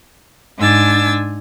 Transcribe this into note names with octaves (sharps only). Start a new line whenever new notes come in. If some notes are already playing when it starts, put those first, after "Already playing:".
G#2 D4 G#5 E6 A6